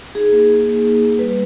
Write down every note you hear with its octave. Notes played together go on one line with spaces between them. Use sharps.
D#4 G#4
A#3
D#4
A#3
D#4
A#3
G3 B4